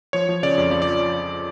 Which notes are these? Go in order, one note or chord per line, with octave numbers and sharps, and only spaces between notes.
F3 C#5
F3
C#3 D5
F2
F3 D5
D5